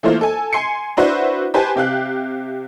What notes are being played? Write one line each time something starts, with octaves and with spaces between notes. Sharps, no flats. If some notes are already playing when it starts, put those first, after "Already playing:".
E3 A3 A#3 F4 C5
A4 G#5
G#5 C6 C7 C#7
D4 E4 F#4 B4 C5
G4 B4 C5 G#5 A5
C3 G4 F5 F#6